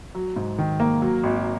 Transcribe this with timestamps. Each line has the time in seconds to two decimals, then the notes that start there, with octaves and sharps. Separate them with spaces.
0.15 F#3
0.36 G#2
0.58 D#3
0.80 A#3
1.02 F#3
1.23 G#1